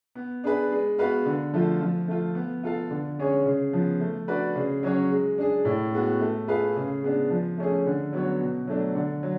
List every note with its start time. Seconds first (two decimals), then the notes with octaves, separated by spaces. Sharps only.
0.15 B3
0.44 D4 G#4 B4
0.71 G#3
0.99 B3 F#4 B4 F5
1.26 D3
1.54 F3 A3 F4
1.81 F3
2.08 A3 F4
2.35 B3
2.63 F4 A4 F5
2.90 D3
3.19 G#3 C#4 G#4 C#5
3.46 C#3
3.73 F3 B3
4.00 A3
4.28 D4 F#4 B4 D5
4.55 C#3
4.83 F#3 C#4 F#4 C#5
5.11 G#3
5.38 D4 G#4
5.65 A2
5.93 G#3 B3 F#4
6.21 A3
6.48 F4 G#4 B4 F5
6.76 C#3
7.03 G#3 B3 D4
7.30 F3
7.58 A3 C#4 G#4
7.86 D3
8.13 F#3 B3 F#4 C#5
8.40 B2
8.67 F#3 A3 D4
8.95 D3
9.23 F#3